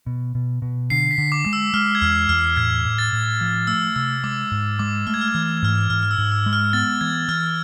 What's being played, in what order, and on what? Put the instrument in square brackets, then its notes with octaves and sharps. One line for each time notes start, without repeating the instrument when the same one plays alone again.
[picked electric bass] B2
B2
B2
[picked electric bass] D3 [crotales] C7
[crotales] B6
[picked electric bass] D3
[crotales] D6
[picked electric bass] G#3
[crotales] E6
[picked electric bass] G#3 [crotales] F6
[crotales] G#6
[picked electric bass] E2 [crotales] F6
[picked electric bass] E2 [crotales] F6
[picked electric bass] A2 [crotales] G#6
[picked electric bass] A2
[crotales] A6
[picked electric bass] A2
F3
[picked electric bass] A3 [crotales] E6
[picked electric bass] C3 [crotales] E6
[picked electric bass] G#3 [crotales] D6
[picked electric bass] G#2
[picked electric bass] G#3 [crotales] D6
[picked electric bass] A3 [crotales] F6
[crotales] G#6
F6
G#6
[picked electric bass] E3 [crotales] F6
[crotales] G#6
F6
G#6
[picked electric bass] G#2 [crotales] F6
[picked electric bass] G#2 [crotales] F6
[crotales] F6
E6
[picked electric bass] G#2
[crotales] E6
[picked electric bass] G#3
[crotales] F6
[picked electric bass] B3 [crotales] A6
[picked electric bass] E3 [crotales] G#6
[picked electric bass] E3 [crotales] F6